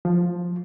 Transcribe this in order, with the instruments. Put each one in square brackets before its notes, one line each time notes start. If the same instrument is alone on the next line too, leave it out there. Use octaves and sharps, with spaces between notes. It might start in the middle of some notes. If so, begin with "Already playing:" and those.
[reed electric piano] F3